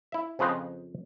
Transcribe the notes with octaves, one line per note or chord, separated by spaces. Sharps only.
E4 E5
F2 C#3 F3 B4 C5 D#5